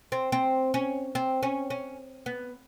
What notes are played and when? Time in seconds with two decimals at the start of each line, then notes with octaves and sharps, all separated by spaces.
0.12 C4
0.32 C4
0.74 C#4
1.15 C4
1.43 C#4
1.70 C#4
2.26 B3